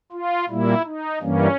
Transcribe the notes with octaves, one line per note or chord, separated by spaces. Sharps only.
F4
A#2 G3 A#3 E4
D#4
G2 E3 G3 A#3 C#4